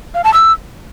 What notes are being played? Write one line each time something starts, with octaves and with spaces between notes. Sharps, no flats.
F5
A5
E6